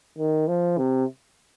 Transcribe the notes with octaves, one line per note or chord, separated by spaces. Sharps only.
D#3
F3
C3